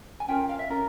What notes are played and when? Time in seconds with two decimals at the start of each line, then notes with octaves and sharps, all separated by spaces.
0.20 G#5
0.28 C#4 F4 A#4 G5
0.49 F5
0.59 E5
0.70 C#4 F4 A#4